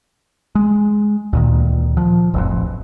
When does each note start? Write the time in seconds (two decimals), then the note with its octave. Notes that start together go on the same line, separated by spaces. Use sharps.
0.55 G#3
1.33 D2 A#2 D#3
1.97 F3
2.34 E1 A1 F2